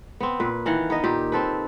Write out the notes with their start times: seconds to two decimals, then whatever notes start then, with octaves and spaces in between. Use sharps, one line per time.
0.20 B3 C4
0.40 A#2 B4
0.66 D#3 E3 F5 F#5
0.90 B3 D#4 D#5
1.04 A#2 G4
1.32 C4 A4 B4